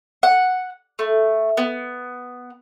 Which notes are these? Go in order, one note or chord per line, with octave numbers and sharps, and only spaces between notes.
F#5
A3
B3